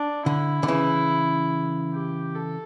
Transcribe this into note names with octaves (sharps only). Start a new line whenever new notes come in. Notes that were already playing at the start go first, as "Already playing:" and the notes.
Already playing: D4
D3 E4
D3
C#3 E3
G4
A4